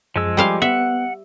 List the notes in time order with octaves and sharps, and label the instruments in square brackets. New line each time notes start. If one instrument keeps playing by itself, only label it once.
[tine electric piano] F#2 G#4 [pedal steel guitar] F3 G#3 E6
[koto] G3 C5 F5 [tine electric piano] G#5 D6
[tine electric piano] B3 [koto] E5 [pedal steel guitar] F#5